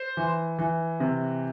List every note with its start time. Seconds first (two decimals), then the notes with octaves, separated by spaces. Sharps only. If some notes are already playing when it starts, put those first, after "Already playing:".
Already playing: C5
0.17 E3
0.59 E3
1.00 C3